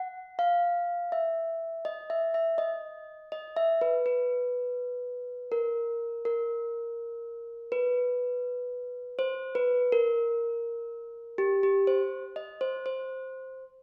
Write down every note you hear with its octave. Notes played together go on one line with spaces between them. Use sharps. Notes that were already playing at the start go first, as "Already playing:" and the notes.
Already playing: F#5
F5
E5
D#5
E5
E5
D#5
D#5
E5
B4
B4
A#4
A#4
B4
C5
B4
A#4
G4
G4
C5
D#5
C5
C5